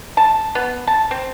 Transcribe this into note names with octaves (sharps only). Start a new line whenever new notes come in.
A5
B3
A5
C4